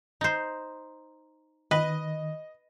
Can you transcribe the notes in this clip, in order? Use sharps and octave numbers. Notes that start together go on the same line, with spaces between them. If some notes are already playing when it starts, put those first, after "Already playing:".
D#4 C5
D#3 B4 D#5